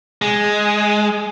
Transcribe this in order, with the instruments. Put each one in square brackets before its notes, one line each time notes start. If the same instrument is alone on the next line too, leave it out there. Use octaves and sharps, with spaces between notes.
[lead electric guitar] G#3